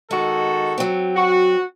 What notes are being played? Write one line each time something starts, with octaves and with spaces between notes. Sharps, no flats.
D#3 G#3 F#4 A4
F#3 C4
F#4